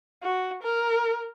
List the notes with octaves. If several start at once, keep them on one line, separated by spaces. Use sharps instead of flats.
F#4
A#4